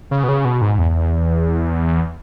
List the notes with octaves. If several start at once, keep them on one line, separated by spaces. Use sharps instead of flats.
C#3
B2
C#3
B2
G#2
E2